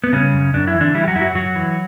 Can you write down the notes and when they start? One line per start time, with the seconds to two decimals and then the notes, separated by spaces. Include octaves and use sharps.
0.04 B3
0.13 C#3 G3 C#4
0.33 F#2
0.53 F#2 D4
0.67 E4
0.74 E3
0.81 D3 D4
0.94 E3 G3 E4
1.04 G4
1.08 F#3 F#4
1.15 F#2 E4
1.21 F#3 F#4
1.35 F#2 F#3 F#4
1.56 E3